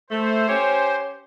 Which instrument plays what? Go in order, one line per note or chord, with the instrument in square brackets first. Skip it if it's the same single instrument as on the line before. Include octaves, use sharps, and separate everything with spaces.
[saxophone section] A3 [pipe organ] C5
[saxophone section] C#4 G4 C#5